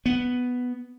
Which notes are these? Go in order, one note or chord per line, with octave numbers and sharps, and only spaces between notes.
B3